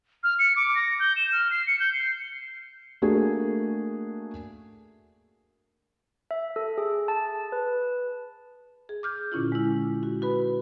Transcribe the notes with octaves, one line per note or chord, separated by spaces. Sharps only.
F6
C#7
D6
A#6
G6
E7
F6
C7
C#7
G6
C7
A3 A#3 D4 F#4 G#4
E5
A4
G#4
A5
B4
G#4
D6 F6 G6
A#2 D3 C#4 E4 F4
G#3 E4
F#4
F#4 B4 B5